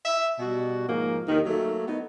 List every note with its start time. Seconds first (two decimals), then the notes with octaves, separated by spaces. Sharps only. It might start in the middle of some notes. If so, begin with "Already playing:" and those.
0.06 E5
0.39 B2 G3 F#4
0.88 G#2 F3 A#3
1.27 D#2 D#3
1.46 F#3 A3 A#3
1.87 B3 D#4